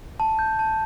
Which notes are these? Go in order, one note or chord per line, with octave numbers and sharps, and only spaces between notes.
A5
G6
A5